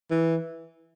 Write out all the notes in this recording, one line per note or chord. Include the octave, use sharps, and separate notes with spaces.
E3